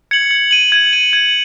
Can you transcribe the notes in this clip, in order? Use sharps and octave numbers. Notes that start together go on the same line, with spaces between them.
G#6 C#7 F#7
G#6
D#7 F#7
G#6
D#7 F#7
G#6